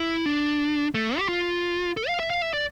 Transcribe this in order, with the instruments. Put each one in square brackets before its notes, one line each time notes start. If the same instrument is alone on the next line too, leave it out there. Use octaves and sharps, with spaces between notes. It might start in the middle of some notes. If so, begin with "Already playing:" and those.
Already playing: [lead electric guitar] E4
D4
A3
G4
F4
A4
F5
E5
F5
E5
D5